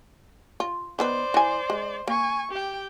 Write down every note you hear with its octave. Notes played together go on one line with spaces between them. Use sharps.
F4
D#3 B3 B4 C5 D5
E3 G#5
G#3
A#3 G#5 C#6
G4 G5